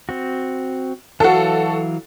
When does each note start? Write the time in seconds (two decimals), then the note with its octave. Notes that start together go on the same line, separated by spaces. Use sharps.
0.09 C4 F#4
1.20 E3 F#3 F#4 A4 F5